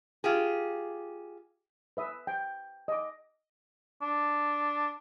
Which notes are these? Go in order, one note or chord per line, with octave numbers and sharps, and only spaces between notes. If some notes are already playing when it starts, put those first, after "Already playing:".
F4 G4 G#4
B4 E5 D#6
G5
D#5 D6
D4